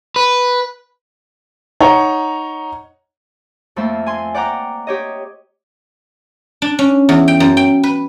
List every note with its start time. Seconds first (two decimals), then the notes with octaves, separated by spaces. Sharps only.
0.16 B4
1.81 D#4 C#5 F#5 A#5
3.76 F2 A3 A#3 C5 E5
4.06 G#5 C6
4.34 D5 F#5 G5 A#5 D6
4.87 G4 C#5 D#5
6.62 D4
6.79 C#4
7.09 E2
7.28 G5
7.40 F#2
7.57 G5
7.84 B4